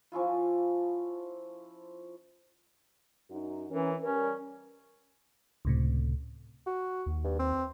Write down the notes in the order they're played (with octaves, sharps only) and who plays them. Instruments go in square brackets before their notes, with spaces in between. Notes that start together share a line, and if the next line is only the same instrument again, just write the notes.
[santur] F3 C#4 E4 F4
[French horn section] F#2 D#4 F#4
[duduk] E3 [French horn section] C#4 A#4
[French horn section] G3 A#4 [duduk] C#4
[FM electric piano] C#2 A2 C3
[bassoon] F#4
[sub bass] D#2
[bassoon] G2
C4